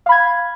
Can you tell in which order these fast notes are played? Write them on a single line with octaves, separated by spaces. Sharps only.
F5 B5 G#6